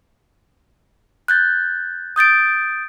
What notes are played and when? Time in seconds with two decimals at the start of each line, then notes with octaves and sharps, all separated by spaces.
1.28 F#6 G6 A6
2.16 D#6 G6 A6 D7